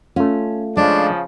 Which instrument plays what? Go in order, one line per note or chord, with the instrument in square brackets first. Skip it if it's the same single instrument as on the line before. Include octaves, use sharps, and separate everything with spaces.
[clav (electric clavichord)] A3 F4 [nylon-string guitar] C#4
[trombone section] C#3 F3 [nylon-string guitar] G#3 [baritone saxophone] D4